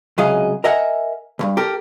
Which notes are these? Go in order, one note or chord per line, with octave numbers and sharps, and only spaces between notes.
C#2 C3 F#3 G#4 D#5 F5
A#4 D#5 E5 F#5 G#5
C#2 G2
G4 A4 A#4